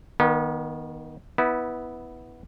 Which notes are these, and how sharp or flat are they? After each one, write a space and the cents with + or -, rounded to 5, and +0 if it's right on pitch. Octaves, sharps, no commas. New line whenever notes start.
D#3 +0 B3 -35
B3 +0 E4 -20